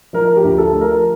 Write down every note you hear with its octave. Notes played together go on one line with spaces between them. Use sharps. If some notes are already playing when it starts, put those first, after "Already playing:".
F3 A#4
G4
D2
A4
F3
A#4